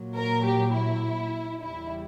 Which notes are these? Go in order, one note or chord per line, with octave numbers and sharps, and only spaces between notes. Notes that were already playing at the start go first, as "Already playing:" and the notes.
Already playing: A#2 F#3
A#4
G4
E4
E2 C#3 E3 G3 E4